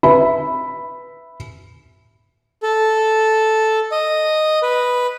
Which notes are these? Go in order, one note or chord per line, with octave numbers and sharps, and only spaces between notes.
B4 E5 B5
A4
D#5
B4